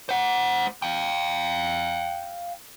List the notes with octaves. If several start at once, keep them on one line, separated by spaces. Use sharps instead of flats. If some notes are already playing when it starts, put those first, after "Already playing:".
C5 F#5
F5 G5